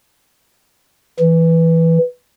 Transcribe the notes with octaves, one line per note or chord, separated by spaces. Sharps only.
E3